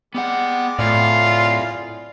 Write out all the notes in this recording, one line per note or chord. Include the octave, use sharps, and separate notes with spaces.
G3 G#3 B3 F#5 D6
A2 E4 F4 G#4 D5 F5